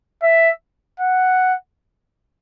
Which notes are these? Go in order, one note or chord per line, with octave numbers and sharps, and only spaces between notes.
E5
F#5